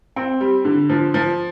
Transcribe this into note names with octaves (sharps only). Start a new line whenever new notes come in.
C4
G3
D3
F3
F3